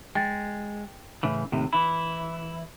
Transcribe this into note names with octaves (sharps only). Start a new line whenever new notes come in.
G#3 G5 A6
A2 C#3 E3
D#2 A2 C3
E3 E4 B5